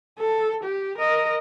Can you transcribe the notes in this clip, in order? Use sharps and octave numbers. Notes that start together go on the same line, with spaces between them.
A4
G4
A#4 D#5